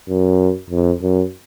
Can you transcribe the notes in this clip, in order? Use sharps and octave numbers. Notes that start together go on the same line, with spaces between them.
F#2
F2
F#2